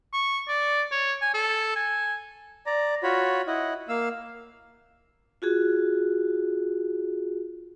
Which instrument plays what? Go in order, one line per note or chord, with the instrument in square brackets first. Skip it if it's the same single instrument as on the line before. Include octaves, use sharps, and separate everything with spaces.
[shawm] C#6
D5
C#5
G#5
A4
G#5
[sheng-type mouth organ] D5 A#5
F4 F#4 C#5 B5
E4 D#5 F#5
A#3 F5 E6
[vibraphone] F4 F#4 G#4